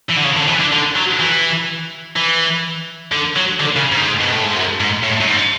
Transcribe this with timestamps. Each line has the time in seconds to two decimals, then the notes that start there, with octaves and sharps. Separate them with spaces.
0.10 E3
0.17 D3
0.24 C#3
0.37 D3
0.48 E3
0.60 D3
0.73 D3
0.96 F#3
1.20 E3
2.16 E3
3.12 D3
3.36 F#3
3.60 D3
3.76 C#3
3.92 G#2
4.21 B2
4.32 A2
4.44 G#2
4.56 F#2
4.80 G#2
5.03 A2
5.21 F#2
5.28 G#2